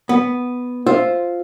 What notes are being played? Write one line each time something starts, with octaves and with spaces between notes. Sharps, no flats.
B3
F4 C5 E5